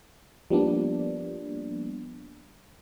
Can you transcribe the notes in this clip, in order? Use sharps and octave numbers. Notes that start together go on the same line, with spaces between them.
F3 G3 A#3 B3 D4